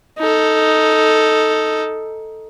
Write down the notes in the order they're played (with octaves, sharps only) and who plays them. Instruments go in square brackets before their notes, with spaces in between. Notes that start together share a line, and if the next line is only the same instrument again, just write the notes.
[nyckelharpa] D#4 A4